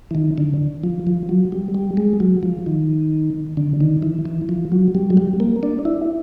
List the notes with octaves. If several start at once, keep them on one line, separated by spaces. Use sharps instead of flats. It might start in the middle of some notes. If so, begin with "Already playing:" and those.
E3
D#3
D3
F3
F3
F#3
G3
G3
G#3
F#3
F3
D#3
D3
D#3
E3
E3
F3
F#3
G3
F#3
G3
A#3
D4
E4